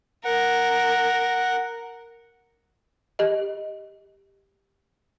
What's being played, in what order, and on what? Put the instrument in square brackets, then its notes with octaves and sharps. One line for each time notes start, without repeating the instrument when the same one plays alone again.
[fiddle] A#4 [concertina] F#5
[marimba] G4 D#5